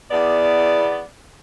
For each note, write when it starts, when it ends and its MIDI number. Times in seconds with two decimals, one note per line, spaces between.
0.11 1.02 40
0.11 1.02 59
0.11 1.02 74